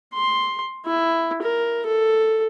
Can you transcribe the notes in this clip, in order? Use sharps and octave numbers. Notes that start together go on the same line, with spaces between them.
C6
E4
A#4
A4